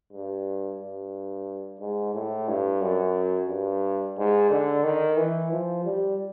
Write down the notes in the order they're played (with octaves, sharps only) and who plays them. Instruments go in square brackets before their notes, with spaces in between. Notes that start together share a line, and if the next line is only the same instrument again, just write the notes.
[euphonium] G2
G2
G#2
A2
G2
F#2
G2
G#2
D3
D#3
E3
F3
G3